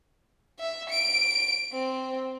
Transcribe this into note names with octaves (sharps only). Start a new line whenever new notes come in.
E5
D7
C4